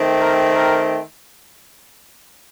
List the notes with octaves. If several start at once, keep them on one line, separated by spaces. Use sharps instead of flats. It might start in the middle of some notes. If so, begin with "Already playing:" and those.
Already playing: D#3 A3 C4
A#4
A#4